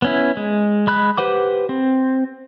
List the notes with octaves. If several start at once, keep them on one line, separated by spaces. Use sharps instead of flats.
B3 C#4 E4
G#3
G#3 B5 F#6
G4 B4 C5 F#5 D6
C4